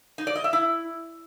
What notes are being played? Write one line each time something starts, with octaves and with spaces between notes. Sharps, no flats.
D#4
D5
D#5
E5
E4